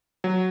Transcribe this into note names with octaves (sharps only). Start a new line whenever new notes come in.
F#3